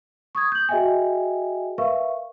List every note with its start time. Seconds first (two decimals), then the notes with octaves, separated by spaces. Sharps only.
0.35 C#6 D#6 G#6
0.52 G6 F#7
0.69 F#4 G#4 D#5 E5 G5 G#5
1.78 A#4 B4 E5 F5 C#6